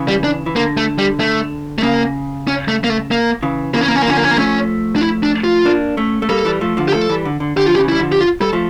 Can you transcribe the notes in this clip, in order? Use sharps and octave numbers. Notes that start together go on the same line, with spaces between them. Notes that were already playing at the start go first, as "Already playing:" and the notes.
Already playing: C#3 E3
G3
D4
E3
D3 A#3
A3
G3
A3
A3
C#3 A#3
C#4
A3
A#3
A3
A#3
C#3 E3
C#3 E3 A#3
C#4
A#3
C#4
A#3
D3 F3 C#4
A#3
C#4
A#3
F3 A3 C#4
D4
E4
D4
F4
A#3 D4
A3 C#4
A3
G3 A#3 A4
E3 G3
F3 A3
D3 F3
G4
F3 A3 A4
E3 G3
D3
D3
D3 G4
F3 F4
G4
C#3 E3
G3 E4
D3 F3
G4
F4
G3 A4
F3 A3